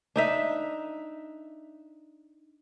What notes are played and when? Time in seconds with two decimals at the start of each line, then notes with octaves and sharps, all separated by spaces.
0.16 D4 D#4 E5